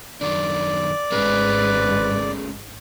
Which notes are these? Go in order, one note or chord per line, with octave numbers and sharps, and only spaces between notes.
F#2 D#3 D4 D5
G#1 G#2 A3 C#4 G#4 B4